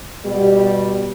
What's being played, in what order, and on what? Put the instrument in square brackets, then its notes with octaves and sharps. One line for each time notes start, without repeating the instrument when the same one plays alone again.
[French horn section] B2 G3